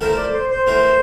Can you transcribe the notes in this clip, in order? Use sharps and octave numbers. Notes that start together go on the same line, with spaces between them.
F3 A3 E4 A4 A#4 C5
D5
C5
C5
E3 A3 E4 A#4 C5